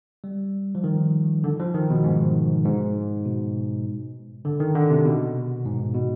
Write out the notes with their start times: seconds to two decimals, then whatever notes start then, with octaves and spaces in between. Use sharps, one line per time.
0.24 G3
0.75 F3
0.84 D#3
1.44 D3
1.60 F3
1.74 D#3
1.90 B2
2.04 G#2
2.65 G#2
3.25 B2
4.45 D3
4.60 D#3
4.75 D3
4.90 C3
5.05 B2
5.65 G#2
5.94 B2